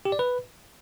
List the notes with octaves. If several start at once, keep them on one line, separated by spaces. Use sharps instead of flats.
G4
D5
B4